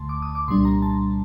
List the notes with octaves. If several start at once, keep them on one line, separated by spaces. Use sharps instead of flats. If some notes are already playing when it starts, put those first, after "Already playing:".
Already playing: D2 D3 A3 A5 C6
D6
D#6
D6
C2 A#2 G3 D4 C6
A#5
A5